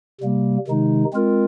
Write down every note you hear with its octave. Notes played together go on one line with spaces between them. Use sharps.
C3 G3 A#3
C3 D#3 G#3 D#4
G#3 C4 F4 A#4